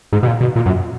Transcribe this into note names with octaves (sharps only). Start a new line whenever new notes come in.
G#2
B2
A#2
B2
A#2
F#2